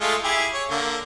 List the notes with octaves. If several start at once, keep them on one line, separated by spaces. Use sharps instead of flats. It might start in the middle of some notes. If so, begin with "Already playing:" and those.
G#3 A3 F4
E4 G4 G#4
C#5
D3 A#3